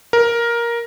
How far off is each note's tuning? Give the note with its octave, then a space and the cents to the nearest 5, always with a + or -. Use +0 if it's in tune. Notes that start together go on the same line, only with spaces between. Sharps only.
A#4 +10